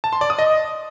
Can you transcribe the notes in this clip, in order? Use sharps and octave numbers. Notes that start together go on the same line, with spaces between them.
A5
C6
D5
D#6
D#5